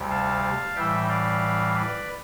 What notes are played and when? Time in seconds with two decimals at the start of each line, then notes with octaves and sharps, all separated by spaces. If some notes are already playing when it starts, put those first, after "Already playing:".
Already playing: D2 C3 G3
0.11 F5 A5
0.76 A2 E3 G3 E5 G5
1.09 D5 F5
1.74 B4 D5